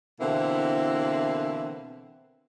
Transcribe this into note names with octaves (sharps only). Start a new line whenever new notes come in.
B2 D3 E3 A#3 C4 E4